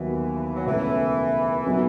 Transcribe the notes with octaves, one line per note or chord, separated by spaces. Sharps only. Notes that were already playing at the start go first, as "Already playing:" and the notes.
Already playing: D#2 D#3 E3 F#3 B3 F#4
F#3
C#2 B2 E3 A3
B2 F#3 B3 D#4 A4